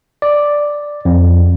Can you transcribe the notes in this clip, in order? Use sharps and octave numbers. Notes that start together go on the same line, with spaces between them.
D5
F2